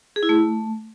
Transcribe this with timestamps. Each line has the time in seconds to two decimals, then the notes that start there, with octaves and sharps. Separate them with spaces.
0.16 G#4
0.23 E4
0.29 A3